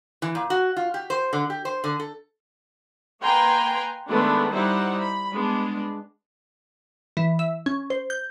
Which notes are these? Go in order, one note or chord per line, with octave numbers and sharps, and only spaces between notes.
E3
A#2
F#4
F4
G4
C5
D3
G4
C5
D3
A4
A#3 B4 G5 G#5 A#5 C6
D#3 G#3 A3 B3 D4
G3 D#4 E4 C5 F#5
B5
G#3 B3 D4
E3
E5
C#4
C5
G6